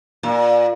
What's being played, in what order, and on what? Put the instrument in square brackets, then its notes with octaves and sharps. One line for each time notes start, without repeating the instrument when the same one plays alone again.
[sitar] A#2